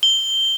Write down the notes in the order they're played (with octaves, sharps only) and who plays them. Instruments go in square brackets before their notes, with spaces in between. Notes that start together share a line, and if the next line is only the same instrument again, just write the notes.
[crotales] G7